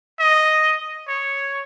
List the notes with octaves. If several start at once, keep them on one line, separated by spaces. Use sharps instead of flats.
D#5
C#5